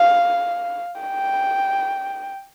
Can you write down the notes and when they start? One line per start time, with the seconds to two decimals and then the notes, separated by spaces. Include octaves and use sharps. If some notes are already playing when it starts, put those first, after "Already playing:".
Already playing: F5
1.02 G5